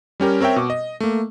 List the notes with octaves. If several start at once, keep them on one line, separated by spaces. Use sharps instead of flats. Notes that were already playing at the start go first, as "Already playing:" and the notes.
G3 C#4 G4 A#4
C4 A#4 C#5 E5 G5
B2 C#6 D6
D#5
A3 A#3